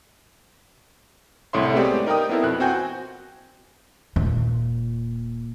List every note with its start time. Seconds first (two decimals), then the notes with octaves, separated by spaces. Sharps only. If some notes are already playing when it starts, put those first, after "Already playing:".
1.53 C2 A2 C#5 E5 C6
1.74 G#3 A3 B3 C4 G4 D5
2.06 D#4 A#4 D5 G5 D#6
2.29 B3 C4 E4 A4 A#4
2.43 F2 B2 F#6
2.60 C4 F#4 G5 G#5 G6
4.16 D#1 A#2